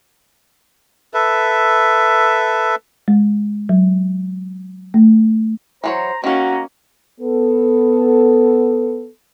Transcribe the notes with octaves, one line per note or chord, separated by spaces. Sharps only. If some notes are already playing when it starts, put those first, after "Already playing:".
A4 B4 E5
G#3
F#3
A3
E3 F#3 C5 C#5 A#5
D#3 A#3 C#4 F#4 A#5
B3 A4